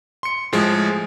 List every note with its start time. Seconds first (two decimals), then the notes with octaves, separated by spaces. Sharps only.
0.23 C6 C#7
0.52 A2 F3 G#3